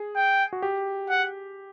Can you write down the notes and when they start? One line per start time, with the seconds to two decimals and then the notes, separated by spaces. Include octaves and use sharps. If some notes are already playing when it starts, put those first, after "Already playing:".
Already playing: G#4
0.16 G5
0.53 F#4
0.62 G4
1.09 F#5